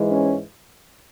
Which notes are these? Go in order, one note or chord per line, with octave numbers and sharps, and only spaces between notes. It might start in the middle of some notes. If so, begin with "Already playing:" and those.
Already playing: G#2 E3 G#3
C#4